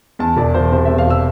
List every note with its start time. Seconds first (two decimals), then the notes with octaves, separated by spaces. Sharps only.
0.19 E2 A5
0.37 E1 D5
0.54 E1 C5
0.72 C3 C5
0.85 E2 E5
0.98 F5
1.06 E1 E6